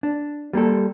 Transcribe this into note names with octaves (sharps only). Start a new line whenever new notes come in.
D4
G3 A#3 G4 A4